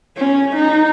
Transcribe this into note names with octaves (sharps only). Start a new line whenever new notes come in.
C#4
D#4